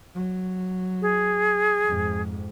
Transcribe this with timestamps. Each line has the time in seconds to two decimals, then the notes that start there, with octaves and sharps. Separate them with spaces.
0.15 F#3
1.02 G#4
1.85 F2 G#2